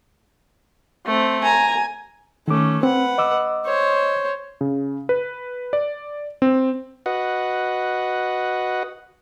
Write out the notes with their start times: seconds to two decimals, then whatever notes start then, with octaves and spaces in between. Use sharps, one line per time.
1.06 A3 C4
1.44 G#5 A#5
2.48 D#3 A3 C#4 D6
2.83 C4 B4 F#5
3.18 D#5 D6 E6
3.66 C5 C#5
4.61 C#3
5.09 B4
5.73 D5
6.42 C4
7.06 F#4 B4 D#5 F#5